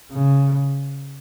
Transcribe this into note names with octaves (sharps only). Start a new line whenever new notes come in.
C#3